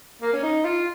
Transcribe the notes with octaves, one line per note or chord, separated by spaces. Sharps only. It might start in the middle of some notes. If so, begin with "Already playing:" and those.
A#3
C#4
D#4
F4